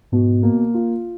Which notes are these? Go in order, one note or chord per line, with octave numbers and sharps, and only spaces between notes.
G#2 B2
A#3
F4